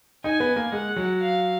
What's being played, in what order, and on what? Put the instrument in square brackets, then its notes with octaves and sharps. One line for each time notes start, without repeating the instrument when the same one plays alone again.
[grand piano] D#4 [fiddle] G#5
[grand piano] B3
A#3
[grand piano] G#3 [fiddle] F#5
[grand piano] F#3
[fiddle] F5